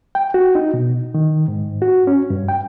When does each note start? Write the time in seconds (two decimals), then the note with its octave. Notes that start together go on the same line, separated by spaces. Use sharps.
0.15 G5
0.34 F#4
0.55 D#4
0.74 B2
1.14 D#3
1.48 G#2
1.82 F#4
2.07 C#4
2.30 G2
2.49 G5